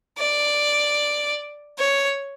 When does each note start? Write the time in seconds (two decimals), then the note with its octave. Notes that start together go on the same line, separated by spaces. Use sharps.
0.18 D5
1.79 C#5